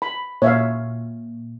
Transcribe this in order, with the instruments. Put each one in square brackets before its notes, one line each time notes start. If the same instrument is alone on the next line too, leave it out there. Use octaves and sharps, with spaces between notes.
[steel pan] B5
[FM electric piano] A#2 [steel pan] C#5 E5 F5